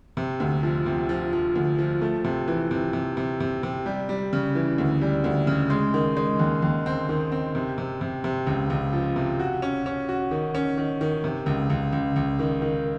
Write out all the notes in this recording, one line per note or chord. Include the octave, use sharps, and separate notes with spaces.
C3
D2
F3
C3
F3
F3
D2
F3
A3
C3
E3
C3
C3
C3
C3
C3
G3
G3
C#3
E3
D2
G3
D2
C#3
G#3
D#3
G#3
D#2
D#2
C4
D#3
C4
C3
C3
C3
C3
C#2
C#2
F3
C3
F#4
C#4
C#4
F#4
D#3
C#4
D#3
D#3
C3
C#2
C#2
C#2
C#2
D#3
D#3